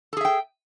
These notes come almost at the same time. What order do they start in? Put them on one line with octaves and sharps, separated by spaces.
A4 G#4 E5 G5